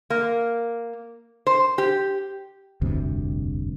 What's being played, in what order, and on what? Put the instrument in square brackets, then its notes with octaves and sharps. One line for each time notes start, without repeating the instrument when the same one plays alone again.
[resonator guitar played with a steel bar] A#3
C5
G4
[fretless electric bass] F1 D2 G2 C3